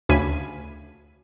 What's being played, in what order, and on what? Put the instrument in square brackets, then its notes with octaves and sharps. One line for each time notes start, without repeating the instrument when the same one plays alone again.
[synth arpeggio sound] D2 C#3 G#5 B5 B6 D#7